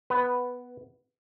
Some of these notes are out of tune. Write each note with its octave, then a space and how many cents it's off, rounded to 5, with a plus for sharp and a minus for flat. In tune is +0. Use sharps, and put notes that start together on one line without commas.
B3 +0 B4 +0